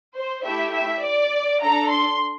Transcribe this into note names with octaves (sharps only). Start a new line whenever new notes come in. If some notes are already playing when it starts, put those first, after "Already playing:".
C5
A3 E4 G4 E5
E5
D5
D4 A4 A#5
C6